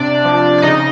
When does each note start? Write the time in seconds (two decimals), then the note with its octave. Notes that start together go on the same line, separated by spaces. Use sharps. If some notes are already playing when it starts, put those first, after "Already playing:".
Already playing: C3 D4 D5
0.25 F3
0.58 D5
0.62 C#3 D#4 D#5